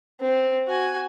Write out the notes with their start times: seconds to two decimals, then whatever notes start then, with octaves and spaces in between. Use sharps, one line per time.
0.20 C4
0.68 F#4 G#5